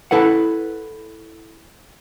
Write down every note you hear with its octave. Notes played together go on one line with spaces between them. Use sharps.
E4 A4 B4 F#5